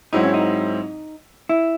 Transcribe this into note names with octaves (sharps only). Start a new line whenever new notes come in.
G#2 F#3 C4 D#4 E4
C#4
D#4
E4